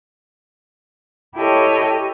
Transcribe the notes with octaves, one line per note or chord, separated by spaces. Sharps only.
E4 G4 A4 C#5 D#5